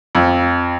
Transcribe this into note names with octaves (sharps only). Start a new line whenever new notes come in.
F2